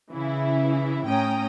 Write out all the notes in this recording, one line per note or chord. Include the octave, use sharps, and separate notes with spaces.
C#3 E3 E4
A2 C#4 G5 A#5 D#6